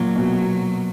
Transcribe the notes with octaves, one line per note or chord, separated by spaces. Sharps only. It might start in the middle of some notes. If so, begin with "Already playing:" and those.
Already playing: A#2 F#3
B2
B2